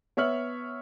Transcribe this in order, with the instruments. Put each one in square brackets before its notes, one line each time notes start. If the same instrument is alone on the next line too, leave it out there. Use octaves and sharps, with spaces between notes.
[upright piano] B3 C#5 E5 F6 F#7